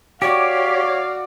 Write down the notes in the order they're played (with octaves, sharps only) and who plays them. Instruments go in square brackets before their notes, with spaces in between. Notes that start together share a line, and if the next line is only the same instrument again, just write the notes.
[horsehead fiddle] F#4 D5 [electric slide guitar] G4 [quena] C#5 [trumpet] F5